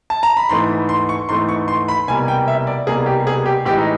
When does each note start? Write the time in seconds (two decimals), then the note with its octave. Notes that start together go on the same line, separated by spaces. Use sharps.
0.10 A5
0.23 A#5
0.37 B5
0.49 G#2 E3 A3 C6
0.89 C6
1.09 C#6
1.29 G#2 E3 A3 C6
1.49 C#6
1.68 C6
1.88 B5
2.08 C2 B2 G3 A#3 G#5
2.28 G5
2.48 E5
2.67 D5
2.87 C2 B2 G3 A#3 G#4
3.06 G4
3.27 G#4
3.46 G4
3.65 A2 E3 G#3 G4
3.78 D#4